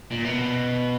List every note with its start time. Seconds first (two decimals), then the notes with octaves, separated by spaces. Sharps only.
0.11 A#2
0.25 B2